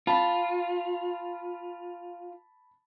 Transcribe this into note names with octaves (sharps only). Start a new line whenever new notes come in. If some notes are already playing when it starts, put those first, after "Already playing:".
F4 A5 B5